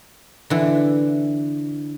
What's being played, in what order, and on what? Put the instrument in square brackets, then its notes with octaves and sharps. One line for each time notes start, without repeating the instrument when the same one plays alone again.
[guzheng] D3 E3